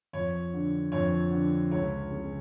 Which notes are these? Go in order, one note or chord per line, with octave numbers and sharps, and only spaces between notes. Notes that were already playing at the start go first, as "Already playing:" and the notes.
F2 C#5
D3
F2 C#5
D3
C#2 C#5
C#3